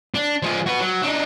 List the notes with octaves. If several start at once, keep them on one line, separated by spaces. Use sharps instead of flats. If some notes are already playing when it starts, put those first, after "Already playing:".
D4
F3 G#3
F#4 B4
F#3
D4 D#4